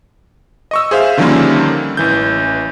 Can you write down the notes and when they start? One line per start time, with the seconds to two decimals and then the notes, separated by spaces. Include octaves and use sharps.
0.71 D#5 C#6 E6
0.91 G#4 C5 E5 F5
1.17 D3 D#3 F3 G3 A#3 C#4
1.97 A1 E3 G6